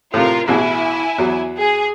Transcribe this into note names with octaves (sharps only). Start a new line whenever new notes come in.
A2 C3 F4 A#4
A1 B2 E4 G#4 G#5
E2 F#3
G#4